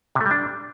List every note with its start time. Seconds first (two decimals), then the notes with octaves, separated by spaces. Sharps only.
0.15 C3
0.21 A3
0.26 G3
0.31 D4